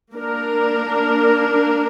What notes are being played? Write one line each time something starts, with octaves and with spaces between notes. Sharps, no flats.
A#3 D4 A#4